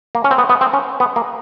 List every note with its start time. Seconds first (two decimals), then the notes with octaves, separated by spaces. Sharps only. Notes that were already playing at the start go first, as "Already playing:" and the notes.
0.15 A#3
0.24 C#4
0.31 C4
0.38 B3
0.49 B3
0.61 C4
0.73 C#4
1.00 B3
1.16 A#3